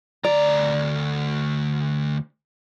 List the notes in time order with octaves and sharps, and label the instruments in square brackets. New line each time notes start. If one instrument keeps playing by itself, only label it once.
[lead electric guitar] D2 A#5 [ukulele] D5